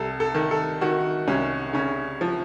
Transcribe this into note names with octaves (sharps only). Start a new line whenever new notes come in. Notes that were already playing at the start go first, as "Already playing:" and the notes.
Already playing: C2 A4
A4
D#3
A4
D#3 F#4
C2 C#4
C#3 C#4
F3